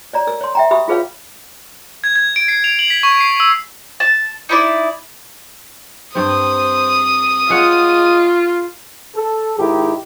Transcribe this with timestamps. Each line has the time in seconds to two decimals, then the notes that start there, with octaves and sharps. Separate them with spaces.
0.13 C#5 D5 A#5
0.27 A#4 E6
0.41 C#5 C6
0.55 E5 G5 A#5
0.71 G4 E5 B5 D#6 E6
0.88 F4 G#4 B4 C#5 F5
2.04 G#6
2.16 G#6
2.36 D7
2.48 C7
2.64 F7
2.79 F#7
2.90 B6
3.03 C#6
3.20 C7
3.40 E6
4.00 A5
4.49 D#4 E4 D5
6.15 G2 C4 C5 D#6
7.50 G#3 F4 G#4 C#5 F#5
9.16 A4
9.59 G#2 D#3 E4 G4